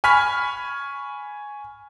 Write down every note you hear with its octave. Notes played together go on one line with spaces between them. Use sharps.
G#5 B5 C#6 F6 B6